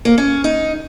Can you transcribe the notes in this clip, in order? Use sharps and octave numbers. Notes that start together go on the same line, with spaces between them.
A#3
C#4
D#4